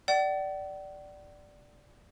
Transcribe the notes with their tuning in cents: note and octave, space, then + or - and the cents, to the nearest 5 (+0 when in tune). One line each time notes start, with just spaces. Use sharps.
D5 +0 F#5 +45